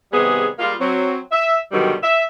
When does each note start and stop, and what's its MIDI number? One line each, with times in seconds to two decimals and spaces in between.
0.13 0.46 48
0.13 0.46 51
0.13 0.46 55
0.13 0.46 59
0.13 0.46 68
0.58 0.73 55
0.58 0.73 56
0.58 0.73 58
0.58 0.73 65
0.80 1.17 54
0.80 1.17 60
1.31 1.57 76
1.72 1.93 43
1.72 1.93 47
1.72 1.93 50
1.72 1.93 51
1.72 1.93 54
1.72 1.93 55
2.03 2.22 76